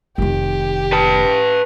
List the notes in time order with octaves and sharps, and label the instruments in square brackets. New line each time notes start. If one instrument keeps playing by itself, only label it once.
[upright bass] F1 D#3 [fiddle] G4
[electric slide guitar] B4 A5